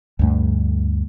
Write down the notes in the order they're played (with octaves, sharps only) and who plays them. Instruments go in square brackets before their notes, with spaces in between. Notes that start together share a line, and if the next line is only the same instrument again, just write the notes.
[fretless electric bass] D2 G2 A3